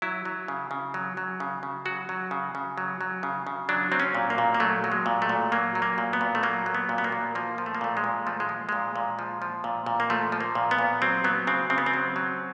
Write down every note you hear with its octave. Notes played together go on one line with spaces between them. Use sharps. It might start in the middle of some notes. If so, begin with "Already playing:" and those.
F#3 E4
F#3
C#3
C#3
F#3
F#3
C#3
C#3
F#3 F#4
F#3
C#3
C#3
F#3
F#3
C#3
C#3
F#3 D4
F#3 C4
C#4
A#2
A#3
A#2
A#3
F#3 A3
F#3
G#3
A#2
A3
A#2
F#3 A#3
F#3
A#3
A#2
B3
A#2
A3
F#3 A#3
F#3
B3
A#2
B3
A#3
A#2
F3 A#3
F3
A3
A#3
A#2 A3
G#3
A#2
F3 A3
G#3
F3
A#2 G#3
A#2
F3
F3
A#2
A#2
A#3
F3 A3
F3
A#3
A#2
B3
A#2
F#3 C4
F#3 B3
C#3 C4
C#3 C4
B3
C4
F#3
F#3